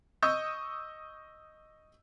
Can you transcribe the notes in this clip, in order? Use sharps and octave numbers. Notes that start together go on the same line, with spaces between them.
D#5 C#6 D#6 E6 G6